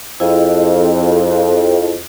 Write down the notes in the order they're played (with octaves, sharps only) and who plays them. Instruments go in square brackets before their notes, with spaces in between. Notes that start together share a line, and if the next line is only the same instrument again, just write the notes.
[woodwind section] F2 [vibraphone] E4 G#4 D#5